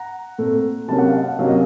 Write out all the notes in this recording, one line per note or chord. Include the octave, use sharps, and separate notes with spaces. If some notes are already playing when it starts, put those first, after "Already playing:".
Already playing: F#5 A#5
A#2 A3 C4
C3 F#3 A#3 C#4 A5
F#5
F5
D#5 F#5
C3 F#3 A#3 C#4 F5
D#5